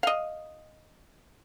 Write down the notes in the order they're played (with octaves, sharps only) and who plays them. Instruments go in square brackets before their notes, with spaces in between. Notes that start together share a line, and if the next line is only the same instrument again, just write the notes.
[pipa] D#5 F5